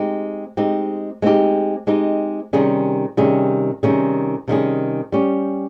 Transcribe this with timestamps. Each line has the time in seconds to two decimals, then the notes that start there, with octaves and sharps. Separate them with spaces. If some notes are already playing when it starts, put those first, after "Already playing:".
Already playing: G#3 C4 D#4 G4
0.57 G#3 C4 D#4 G4
1.22 G#3 C4 D#4 G4
1.87 G#3 C4 D#4 G4
2.53 C3 D#3 G3 C#4 G#4
3.17 C3 D#3 G3 C#4 G#4
3.83 C3 D#3 G3 C#4 G#4
4.48 C3 D#3 G3 C#4 G#4
5.12 G3 C#4 G4